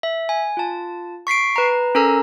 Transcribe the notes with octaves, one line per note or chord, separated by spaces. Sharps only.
E5
G#5
F4 A5
C#6 B6 C7 D7
B4 A#5
C#4 A4 A#4 A#5 E6